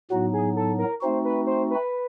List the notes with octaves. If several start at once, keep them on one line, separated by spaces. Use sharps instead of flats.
A2 F#3 B3 D#4 F#4
G#4
A4
A#4
A3 C4 D#4 F#4 C5
B4
C5
B4